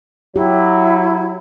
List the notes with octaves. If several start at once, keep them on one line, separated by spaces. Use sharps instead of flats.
F#3 E4 G4